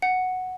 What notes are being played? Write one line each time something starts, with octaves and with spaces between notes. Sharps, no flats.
F#5